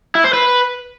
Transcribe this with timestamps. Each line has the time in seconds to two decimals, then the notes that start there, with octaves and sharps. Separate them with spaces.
0.15 E4
0.24 C5
0.33 B4